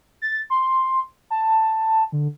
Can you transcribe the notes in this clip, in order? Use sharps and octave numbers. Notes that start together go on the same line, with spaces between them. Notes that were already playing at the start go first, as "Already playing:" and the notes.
A6
C6
A5
D3